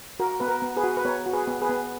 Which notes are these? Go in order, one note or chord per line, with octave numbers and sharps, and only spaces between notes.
F#4 A#4
B3 B4
A#4
B3
G#4 B4
F#4
B4
B3 A#4 C#5
F#4
G#4 B4
B3
G#4 B4
B3